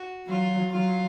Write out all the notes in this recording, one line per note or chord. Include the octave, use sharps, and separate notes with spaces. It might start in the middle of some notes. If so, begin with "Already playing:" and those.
Already playing: F#4
F#3 F4
F#3 F4